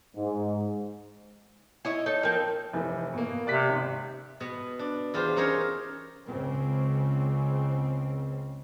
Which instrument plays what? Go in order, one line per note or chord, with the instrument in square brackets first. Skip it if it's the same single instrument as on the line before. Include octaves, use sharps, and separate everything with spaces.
[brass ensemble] G#2
[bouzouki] E4 C#5 D#5
[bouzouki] D#4 A4 [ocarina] C#5
[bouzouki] F3 C4 [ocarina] A#4
[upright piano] F1 E3
B2 A#3
[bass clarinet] C3 [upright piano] D5 F#6 B6
[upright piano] G#1
[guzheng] B2 B3
D4
E2 F4 G4 C5
C#4 D#4 A#4 C5 C#5
[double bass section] C#2 C#3 C4